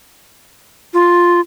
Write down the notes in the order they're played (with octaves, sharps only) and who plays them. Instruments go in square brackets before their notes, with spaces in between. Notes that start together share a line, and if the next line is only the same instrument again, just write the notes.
[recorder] F4